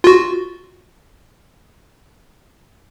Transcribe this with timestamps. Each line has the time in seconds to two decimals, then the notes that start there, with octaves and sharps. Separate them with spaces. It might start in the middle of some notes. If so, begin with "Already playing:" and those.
0.04 F4 F#4